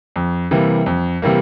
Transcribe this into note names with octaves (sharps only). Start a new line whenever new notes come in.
F2
C3 E3 G3 A#3
F2
C3 E3 G3 A#3